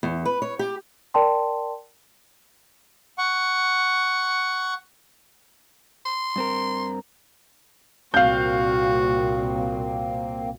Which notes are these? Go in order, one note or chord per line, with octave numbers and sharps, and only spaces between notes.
E2
B4
C#5
G4
A#4 D5 G5 A5 C6
F#5 C#6
C6
G2 C4 A#4
C2 A#2 A#3 C4 F#4 F5 G6